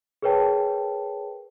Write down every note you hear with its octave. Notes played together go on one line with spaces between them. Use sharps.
G#4 A#4 B4 C#5 G5 A5